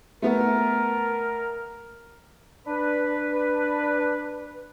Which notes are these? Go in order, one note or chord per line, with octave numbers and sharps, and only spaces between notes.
A3 B3 A#4
D4 B4